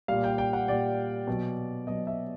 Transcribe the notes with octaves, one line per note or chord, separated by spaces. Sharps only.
A#2 G3 F5
G5
G5
F#5
A#2 G3 D5
B2 F#3
B2 F#3 D#5
E5